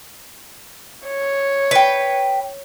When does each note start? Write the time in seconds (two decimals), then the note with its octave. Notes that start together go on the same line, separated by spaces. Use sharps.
1.07 C#5
1.71 B4 G5